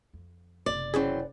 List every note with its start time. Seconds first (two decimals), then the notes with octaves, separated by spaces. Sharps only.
0.13 F2
0.66 F#1 C3 D5
0.94 E3 F#3 C4 C#4 G#4